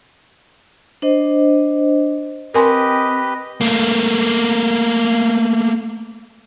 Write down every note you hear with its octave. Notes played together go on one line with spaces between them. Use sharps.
D4 C5 D#5
C4 G4 A#4 B4 D#5 G#5 C6
A3 A#3